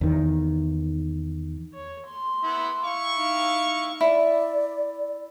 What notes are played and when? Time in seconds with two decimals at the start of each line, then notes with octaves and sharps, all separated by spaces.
0.01 E2 D#3
1.74 C#5
2.06 C6
2.43 B3 E4
2.84 E4 F5 C#6
3.16 D#4 F5
4.01 E4 D5